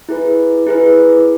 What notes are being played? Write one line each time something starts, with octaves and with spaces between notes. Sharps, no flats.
E4 G#4 B4
E4 G#4 B4